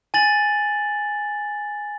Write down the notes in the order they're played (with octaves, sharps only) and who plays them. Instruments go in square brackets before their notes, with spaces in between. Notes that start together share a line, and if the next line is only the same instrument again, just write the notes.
[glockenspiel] G#5 A6 F#7